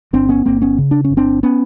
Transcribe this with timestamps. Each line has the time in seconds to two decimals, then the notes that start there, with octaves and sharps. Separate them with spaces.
0.13 G1 C4 D4
0.29 B3 C#4
0.46 G1 A#3 C4
0.62 B3 C#4
0.78 C#3
0.91 D4
1.04 C#4
1.10 G1
1.17 C4 D4
1.43 B3 C#4